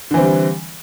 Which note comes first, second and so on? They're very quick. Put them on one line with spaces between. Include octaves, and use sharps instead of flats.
D3 E3 C4 G3